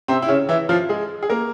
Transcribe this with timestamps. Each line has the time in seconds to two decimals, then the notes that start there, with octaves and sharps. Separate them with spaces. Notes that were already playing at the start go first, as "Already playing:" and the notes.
0.08 C3 C4
0.22 E4
0.28 C#3 C#4
0.49 E3 E4
0.69 F3 F4
0.89 G#3 G#4
1.23 G#4
1.30 A#3 A#4